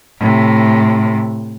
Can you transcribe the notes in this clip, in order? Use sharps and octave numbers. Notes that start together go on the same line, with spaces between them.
A2 C3